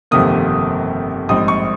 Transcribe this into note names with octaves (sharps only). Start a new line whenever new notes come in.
G1 F2 C3 D#3 A#3 D#6
A#1 G#2 G3 C4 D#4 D#6
C#6